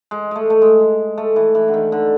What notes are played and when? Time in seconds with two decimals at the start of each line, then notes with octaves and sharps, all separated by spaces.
0.11 G#3
0.31 G#3 A3
0.50 A3
0.62 G#3
0.80 G#3
1.18 A3
1.36 E3
1.55 E3
1.68 D3
1.74 D#3
1.92 D3